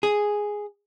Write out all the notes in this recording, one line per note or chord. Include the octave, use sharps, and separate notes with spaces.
G#4